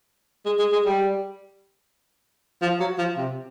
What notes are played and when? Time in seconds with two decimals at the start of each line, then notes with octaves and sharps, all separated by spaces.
0.46 G#3
0.59 G#3
0.73 G#3
0.86 G3
2.62 F3
2.80 F#3
2.99 F3
3.17 C3